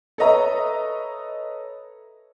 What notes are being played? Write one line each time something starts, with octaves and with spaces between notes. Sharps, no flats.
A4 B4 C#5 D#5 E5 A#5